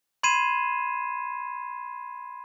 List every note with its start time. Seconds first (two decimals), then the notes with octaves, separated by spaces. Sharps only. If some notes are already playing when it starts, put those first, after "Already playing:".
0.23 B5 C6 G#6 C7 D#7 E7